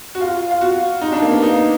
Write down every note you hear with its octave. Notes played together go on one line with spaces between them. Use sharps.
F#4
F4
F4
F#4
D#4
D4
A#3
B3
D#4